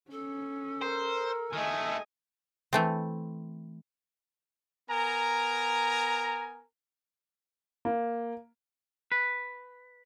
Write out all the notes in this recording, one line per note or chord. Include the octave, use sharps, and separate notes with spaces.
C#4 A4
A#4 C5
D#3 A3 D#5 G#5
E3 A3 C4
B3 A#4 G#5 A#5
A#3
B4